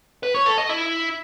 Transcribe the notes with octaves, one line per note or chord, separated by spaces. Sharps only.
B4
C#5
A4
D#5
E4